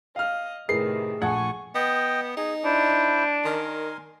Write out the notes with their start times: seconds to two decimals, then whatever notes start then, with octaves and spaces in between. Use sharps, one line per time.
0.16 D#5 F5 F6
0.69 A2 C3 D#3 E4 G#4 A#4 B4 C7
1.22 A#1 A3 F#5 G#5 A5 C#6 G#6
1.75 B3 D#5 G5
2.37 D#4 G#4
2.65 D4 E4 C5
3.45 D#3 A#4 G#5 C6